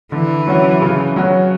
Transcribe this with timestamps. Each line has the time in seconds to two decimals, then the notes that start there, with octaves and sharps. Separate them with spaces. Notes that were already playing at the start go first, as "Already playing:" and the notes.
0.12 D3 E3
0.47 F#3 C#4 F#4
0.82 C#3
1.16 F#3 C#4 F#4